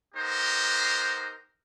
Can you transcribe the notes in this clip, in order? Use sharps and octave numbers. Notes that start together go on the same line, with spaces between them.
B3 D#4 G4 A#4 C5